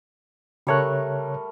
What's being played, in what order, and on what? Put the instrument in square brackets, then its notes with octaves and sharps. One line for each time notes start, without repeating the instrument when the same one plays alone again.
[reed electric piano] C#3 C#5 F#6 [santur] G3 A3 A#4